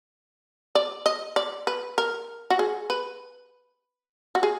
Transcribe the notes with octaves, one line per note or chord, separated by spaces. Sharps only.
D5
D#5
D5
B4
A#4
F#4
G#4
B4
F#4
G#4